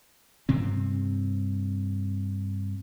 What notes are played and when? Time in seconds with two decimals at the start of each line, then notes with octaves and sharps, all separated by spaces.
0.49 G2 C3 C4